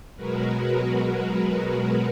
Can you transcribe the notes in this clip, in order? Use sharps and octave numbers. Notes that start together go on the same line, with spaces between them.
B2 F#3 G#3 F#4 A#4 B4